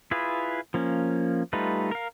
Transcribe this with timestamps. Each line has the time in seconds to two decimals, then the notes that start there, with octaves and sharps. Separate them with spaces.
0.11 E4 F4 G#4 B4
0.74 F3 A#3 C#4
1.53 G3 A3 D#4 F4 B4
1.91 A#4 F5